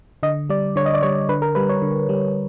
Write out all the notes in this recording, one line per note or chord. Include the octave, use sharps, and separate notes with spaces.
D3 D#5
G3 D5
D3 C#5
D#5
D5
G3 C#5
D3 B4
A#4
G3 B4
C#5
D3
G3